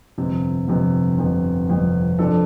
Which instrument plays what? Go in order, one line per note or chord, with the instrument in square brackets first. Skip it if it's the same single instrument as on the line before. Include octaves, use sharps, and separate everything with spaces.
[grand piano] G1 F2 C3
G1 F2 C3
G1 F2 C3
G1 F2 C3
F2 F3 D4 A4